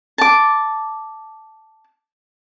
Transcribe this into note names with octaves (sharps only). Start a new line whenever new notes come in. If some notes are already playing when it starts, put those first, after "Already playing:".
A5 D6